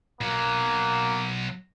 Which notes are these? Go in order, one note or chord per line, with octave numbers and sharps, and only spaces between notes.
B1 F#3 A#3